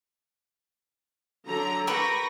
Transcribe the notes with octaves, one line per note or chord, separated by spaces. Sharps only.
D3 F#3 A#5
G4 A#4 B4 B5 C#6 A#6